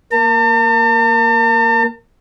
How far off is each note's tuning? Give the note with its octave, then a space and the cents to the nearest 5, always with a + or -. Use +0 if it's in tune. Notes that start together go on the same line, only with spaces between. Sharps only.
A#3 +0 A5 +45